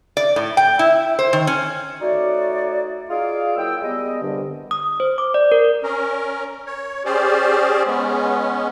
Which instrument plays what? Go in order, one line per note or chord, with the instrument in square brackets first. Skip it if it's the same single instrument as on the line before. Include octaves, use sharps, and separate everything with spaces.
[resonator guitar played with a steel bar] D5
A2
G5
E4
C5
D#3
C#4
[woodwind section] A3 D#4 F#4 C#5 D5
D#4 F4 G#4 D5 F5
F#3 A#3 E4 G5 E6
G3 G#3 B3 D#5
C2 G2 D3 G3 B3 D4
[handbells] D#6
C5
D6
D5
A#4
[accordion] C#4 A#4
C#5
C#4 G4 G#4 C5 D5
G#3 B3 C#4